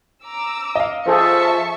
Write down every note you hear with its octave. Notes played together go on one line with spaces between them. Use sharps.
A#5 D6 E6
D#5 F5
F3 G#4 A4 C5 E5 A5 C#6